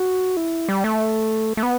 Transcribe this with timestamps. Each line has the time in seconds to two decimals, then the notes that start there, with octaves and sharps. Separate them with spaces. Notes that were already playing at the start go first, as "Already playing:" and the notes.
Already playing: F#4
0.37 E4
0.69 G3
0.84 A3
1.57 A3
1.63 B3